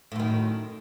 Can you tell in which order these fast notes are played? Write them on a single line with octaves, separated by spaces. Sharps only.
A2 F#2 D#3